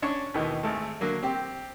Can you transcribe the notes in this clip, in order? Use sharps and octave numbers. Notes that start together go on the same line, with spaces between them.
C#4 D4 C#5 C#6
D#2 B2 D#3 E3
G#1 A3
D3 F#3 A#3
C4 G4